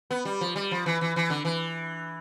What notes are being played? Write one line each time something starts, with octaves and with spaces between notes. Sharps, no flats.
B3
G3
F3
G3
F3
E3
E3
E3
D3
E3